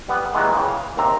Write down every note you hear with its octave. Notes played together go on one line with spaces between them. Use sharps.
G3 B3
A#2 D#3 E3 G#3 B3
C#3 E3 G5
F5
D#2 C3 C4 A#5